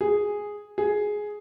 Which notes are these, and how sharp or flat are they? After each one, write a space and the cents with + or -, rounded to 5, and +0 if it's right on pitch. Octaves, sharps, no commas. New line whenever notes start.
G#4 -5
G#4 +5